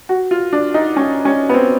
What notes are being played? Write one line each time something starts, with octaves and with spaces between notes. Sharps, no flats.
F#4
F4
D4
D#4
C#4
C#4
B3
C4